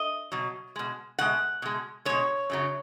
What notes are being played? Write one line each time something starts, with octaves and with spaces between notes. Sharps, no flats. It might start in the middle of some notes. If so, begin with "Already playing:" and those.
Already playing: D#5
B2 F#3
B2 G#3
B2 G#3 F#5
B2 G#3
B2 G#3 C#5
F#2 C#3 F#3